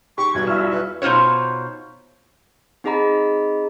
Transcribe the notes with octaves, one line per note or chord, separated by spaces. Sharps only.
D#3 G4 C6 C#6
B1 E2 G2 G3 F#4 G#6
E4 F4 E5 F6
B4
B2 D#4 F4 C5 C#5
C4 D#4 G#4 D#5 A#5 B5